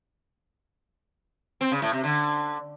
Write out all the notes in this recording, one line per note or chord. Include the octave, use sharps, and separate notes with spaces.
C4
C#3
A2
C3
D3